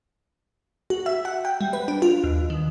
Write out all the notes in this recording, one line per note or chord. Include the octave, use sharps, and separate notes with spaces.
F#4
E5
F#5
G5
G3
B4
D4
F4
D#2
D#3